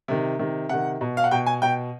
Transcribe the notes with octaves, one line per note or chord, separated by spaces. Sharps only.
C3 D#3
C3 D#3
C3 D#3 F#5
B2
F5
F#5
B2 G5
G#5
B2 G5